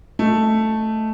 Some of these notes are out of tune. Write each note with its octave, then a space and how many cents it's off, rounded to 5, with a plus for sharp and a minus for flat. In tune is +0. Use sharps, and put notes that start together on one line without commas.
A3 +0 D#5 +0